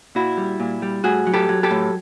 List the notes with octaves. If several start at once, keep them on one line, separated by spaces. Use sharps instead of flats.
A#2 E4 F#4
G3
A#2
G3
A2 F#4 G#4
F#3
G4 A4
F#3
G4 A4
A2